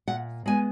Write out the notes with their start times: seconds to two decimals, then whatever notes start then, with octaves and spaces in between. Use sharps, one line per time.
0.08 A#2 F#5
0.46 G#3 B3 G#5